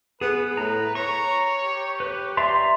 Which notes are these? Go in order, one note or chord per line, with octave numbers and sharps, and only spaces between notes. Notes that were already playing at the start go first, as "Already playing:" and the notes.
B3 G#4 B4
A2 A#5
C#5 A#5 C#6
G4
B4
D5 E5 A#5 C6